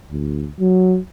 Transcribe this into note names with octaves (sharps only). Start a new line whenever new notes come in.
D2
F#3